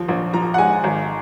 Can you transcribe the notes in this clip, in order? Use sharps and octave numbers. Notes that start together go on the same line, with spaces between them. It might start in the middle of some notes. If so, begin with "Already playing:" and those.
Already playing: D#2 F3
A#1
F3 A#5
F#5
G#3 G#5
G#1